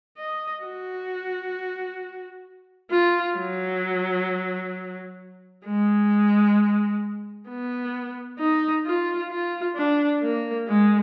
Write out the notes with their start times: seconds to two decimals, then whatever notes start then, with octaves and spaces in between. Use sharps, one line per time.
0.18 D#5
0.64 F#4
2.91 F4
3.37 F#3
5.66 G#3
7.49 B3
8.39 D#4
8.86 F4
9.31 F4
9.76 D4
10.23 A#3
10.68 G#3